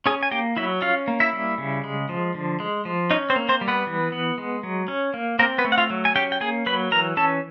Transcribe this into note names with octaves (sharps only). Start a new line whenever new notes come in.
C#4 G#4 G#5
G#5
A#3 G4 G5
F#3 E4 E5
C#4 F4 F5
A#3
E4 E5
G3
C#3
G#3
F3
D3
G#3
F3
C#4 D#4 D#5
C4 C5
A#3
C4 C5
G3
B3 B4
E3
B3
G#3
F#3
C#4
A#3
A#3 C4 A#4
B3 B4
A3
F#5
F4 F5
F#3
G#5
C#4 G4 G5
G5
A#3 G#4 G#5
F#3 B4 B5
E3 A#4 A#5
C#4 A4 A5